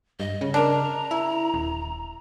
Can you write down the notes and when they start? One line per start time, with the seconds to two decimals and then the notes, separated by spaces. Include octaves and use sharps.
0.20 G2 D#5
0.41 C#3
0.54 D4 A#4 A#5
1.11 E4
1.54 D#1